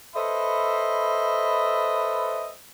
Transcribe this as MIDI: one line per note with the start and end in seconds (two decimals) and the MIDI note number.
0.16 2.49 69
0.16 2.49 71
0.16 2.49 72
0.16 2.49 75
0.16 2.49 76
0.16 2.49 83